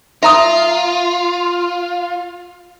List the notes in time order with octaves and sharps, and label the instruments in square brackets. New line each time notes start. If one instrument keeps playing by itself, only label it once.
[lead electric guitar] F4 [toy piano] E5 A#5 D#6